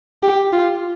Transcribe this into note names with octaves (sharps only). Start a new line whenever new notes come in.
G4
F4